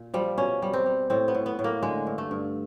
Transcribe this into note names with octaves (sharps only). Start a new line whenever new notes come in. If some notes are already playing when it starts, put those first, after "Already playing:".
Already playing: A#2
F3 G3
B2 C#4
G3
C4
G3
A2 C4
B3
A2
B3
A2
A#3
D3 G#3
G2
A3
G2